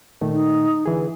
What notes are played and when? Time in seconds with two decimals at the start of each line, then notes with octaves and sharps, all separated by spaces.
0.21 A#2 D#3 A3
0.33 D#4
0.86 D3 E3 G#4